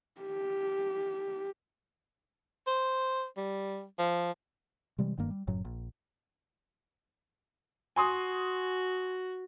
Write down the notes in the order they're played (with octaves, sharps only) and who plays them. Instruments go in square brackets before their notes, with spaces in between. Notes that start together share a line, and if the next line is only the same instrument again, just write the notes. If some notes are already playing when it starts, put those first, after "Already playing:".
[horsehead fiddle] G4
[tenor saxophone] C5
G3
F3
[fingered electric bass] C3 E3 G3 G#3
F1 G2 D#3 A#3
G3
F#1 F#2 A2 F#3
A#1
[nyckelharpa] F#4 [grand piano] G#5 C6 D#6